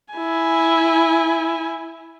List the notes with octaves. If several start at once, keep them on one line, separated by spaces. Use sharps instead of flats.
E4 G#5